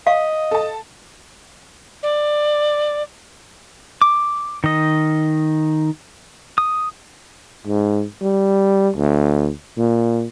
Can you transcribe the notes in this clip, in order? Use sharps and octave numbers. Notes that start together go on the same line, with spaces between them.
D#5 F5
A4 A5
D5
D6
D#3 D#5
D#6
G#2
G3
D2
A#2